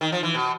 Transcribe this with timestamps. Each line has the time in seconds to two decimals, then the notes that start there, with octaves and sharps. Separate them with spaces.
0.01 D#3
0.12 F3
0.23 E3
0.34 B2